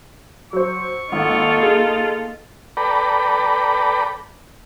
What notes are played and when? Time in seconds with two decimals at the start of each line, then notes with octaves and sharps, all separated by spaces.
0.53 F#3 C5 C#6
1.12 G#1 A#3 D#4 F4 A4
1.63 G#4
2.77 A4 B4 D5 G5 A#5 B5